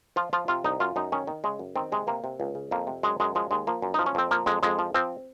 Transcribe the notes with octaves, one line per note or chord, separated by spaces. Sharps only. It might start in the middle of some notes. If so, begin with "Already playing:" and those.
F3 F4
F3 F4
C3 F4
C2 D#4
F#2 F4
F#2 D#4
D#3 C#4
D#3
C#3 G#3
F#2
D#3 C4
C3 G#3
C3 A#3
C3
C#2
C#3
F2 A#3
C3
F#2 G#3
F#2 G#3
F3 G#3
D#2 G#3
F3 A#3
F#2
F3 D#4
C#4
F2 C4
F3 A#3
F2 G#3
F2 G#3
F3
F3 C4